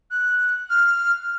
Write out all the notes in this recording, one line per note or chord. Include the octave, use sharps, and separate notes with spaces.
F#6
F6